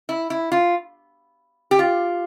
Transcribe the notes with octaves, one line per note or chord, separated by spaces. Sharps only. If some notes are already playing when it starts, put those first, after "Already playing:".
E4
E4
F4
G4
F4